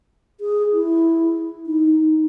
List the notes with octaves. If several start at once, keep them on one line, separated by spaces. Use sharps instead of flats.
G#4
E4
D#4